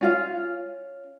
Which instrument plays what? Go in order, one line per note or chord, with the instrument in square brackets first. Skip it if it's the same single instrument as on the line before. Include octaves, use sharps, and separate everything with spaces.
[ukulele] C#4 F4 F5